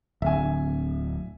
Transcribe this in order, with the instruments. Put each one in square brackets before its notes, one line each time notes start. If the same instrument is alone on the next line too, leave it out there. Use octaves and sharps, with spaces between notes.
[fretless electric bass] D1 [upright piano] E5 G#5